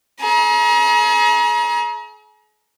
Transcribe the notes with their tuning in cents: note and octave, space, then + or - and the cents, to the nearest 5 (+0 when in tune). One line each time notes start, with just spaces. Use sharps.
G#4 +45 A#5 +35